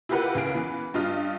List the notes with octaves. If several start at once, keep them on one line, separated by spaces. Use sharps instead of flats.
E4 F4 G4 A#4 B4 F#5
C#2 C#3 D7
E3 B3
G2 F4 D#5 F6